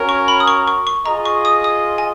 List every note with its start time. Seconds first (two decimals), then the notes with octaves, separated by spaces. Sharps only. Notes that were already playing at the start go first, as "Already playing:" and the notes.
Already playing: C#4 F#4 A#4 C#5
0.09 C#6
0.28 B5
0.40 D#6
0.48 C#6
0.67 C#6
0.87 C#6
1.06 F4 G#4 D#5 A#5
1.25 C#6
1.45 D#6
1.64 D#6
1.98 G#5